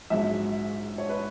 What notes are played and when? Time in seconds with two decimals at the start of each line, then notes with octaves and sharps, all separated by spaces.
0.10 A#1 G#2 F#3 E5
0.98 C#5
1.09 B4